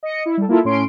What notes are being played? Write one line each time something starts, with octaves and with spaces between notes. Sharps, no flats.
D#5 C#7
E4
G3 A4
A#3 E4 F4 A4
A2 C#4 C6 D7